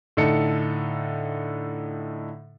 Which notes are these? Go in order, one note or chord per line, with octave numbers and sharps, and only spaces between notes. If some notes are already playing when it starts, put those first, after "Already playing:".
A2 D3 D#4 A4 C#7